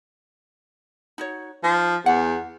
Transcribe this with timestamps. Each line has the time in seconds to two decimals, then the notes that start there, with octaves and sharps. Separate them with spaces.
1.18 D#4 F#4 C#5
1.64 F3 D#4
2.06 E2 F#5